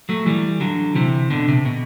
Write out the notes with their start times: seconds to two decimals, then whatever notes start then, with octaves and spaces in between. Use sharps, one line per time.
0.09 F#3 A3
0.26 E3 G3
0.61 D3 F#3
0.96 C3 E3
1.30 B2 D3
1.48 C3
1.66 B2